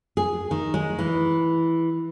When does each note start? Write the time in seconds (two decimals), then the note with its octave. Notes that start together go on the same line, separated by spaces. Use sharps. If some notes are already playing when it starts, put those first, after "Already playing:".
0.17 G#4
0.51 D#3
0.74 G#3
0.99 E3